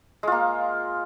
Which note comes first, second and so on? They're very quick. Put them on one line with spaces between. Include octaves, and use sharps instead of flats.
G#3 F4 A#3